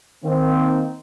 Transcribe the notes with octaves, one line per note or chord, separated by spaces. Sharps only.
D#3 A#3 C4